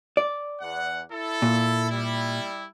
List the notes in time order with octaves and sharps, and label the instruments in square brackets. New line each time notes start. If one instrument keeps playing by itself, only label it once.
[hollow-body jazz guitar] D5
[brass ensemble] E2 F#5
E4 A4
[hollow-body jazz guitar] A#2
[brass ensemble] G3 E4